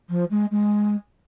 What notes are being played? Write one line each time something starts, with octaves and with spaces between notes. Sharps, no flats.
F3
G#3
G#3